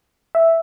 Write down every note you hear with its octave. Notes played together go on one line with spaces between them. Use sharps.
E5